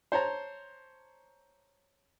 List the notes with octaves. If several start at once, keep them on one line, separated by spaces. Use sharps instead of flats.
C5 C#5 A5 A#5